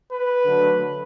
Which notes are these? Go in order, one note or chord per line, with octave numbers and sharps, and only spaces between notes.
B4
D3 F#3 A3